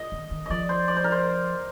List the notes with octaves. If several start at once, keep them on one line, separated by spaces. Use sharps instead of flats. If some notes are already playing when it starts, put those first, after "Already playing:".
Already playing: D#5
D#3
D#3
F3 D5 D#5
C5
D5
C5
A#4
C5